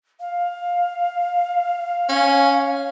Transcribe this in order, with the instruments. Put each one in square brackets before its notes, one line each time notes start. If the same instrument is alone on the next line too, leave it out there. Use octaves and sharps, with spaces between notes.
[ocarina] F5
[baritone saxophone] C#4